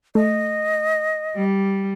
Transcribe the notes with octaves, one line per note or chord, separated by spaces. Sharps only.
A3 D#5
G3